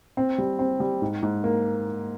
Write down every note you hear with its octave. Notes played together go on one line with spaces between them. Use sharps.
C4
G3
C4
G3
G#2
G#2
A#3